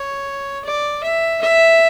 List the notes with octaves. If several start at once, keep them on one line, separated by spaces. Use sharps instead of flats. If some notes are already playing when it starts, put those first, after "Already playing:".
Already playing: C#5
D5
E5
E5